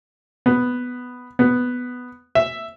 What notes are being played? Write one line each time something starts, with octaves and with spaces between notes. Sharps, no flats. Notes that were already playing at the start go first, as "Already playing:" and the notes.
B3
B3
E5